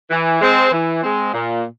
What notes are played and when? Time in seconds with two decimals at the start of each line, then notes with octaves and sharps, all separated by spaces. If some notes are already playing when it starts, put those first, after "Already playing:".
0.10 E3
0.41 G#3 C4
0.72 E3
1.02 G#3 C4
1.34 A#2